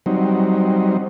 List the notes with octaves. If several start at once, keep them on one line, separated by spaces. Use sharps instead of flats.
F#3 G3 C4 D#4